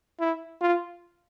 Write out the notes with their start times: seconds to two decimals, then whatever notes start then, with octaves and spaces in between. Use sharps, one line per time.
0.20 E4
0.61 F4